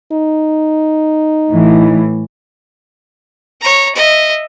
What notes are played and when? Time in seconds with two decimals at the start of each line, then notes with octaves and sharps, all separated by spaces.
0.12 D#4
1.51 A2 E3
3.61 C#5 A#5
3.95 D#5 E5